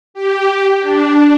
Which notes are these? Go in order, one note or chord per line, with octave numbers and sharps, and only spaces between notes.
G4
D4